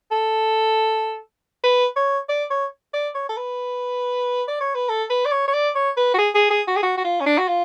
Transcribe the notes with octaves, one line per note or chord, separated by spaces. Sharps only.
A4
B4
C#5
D5
C#5
D5
C#5
A4
B4
D5
C#5
B4
A4
B4
D5
C#5
C#5
D5
C#5
B4
F#4
G#4
G#4
G#4
F#4
G#4
F#4
F#4
F4
C#4
D4
F#4
F4